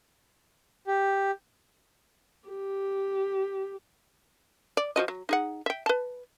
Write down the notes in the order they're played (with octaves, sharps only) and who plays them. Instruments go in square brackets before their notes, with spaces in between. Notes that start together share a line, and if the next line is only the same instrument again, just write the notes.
[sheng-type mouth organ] G4
[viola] G4
[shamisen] D5
F3 F#4 D#5
F#3
D#4 G#4 F#5
E5 G5
B4 A5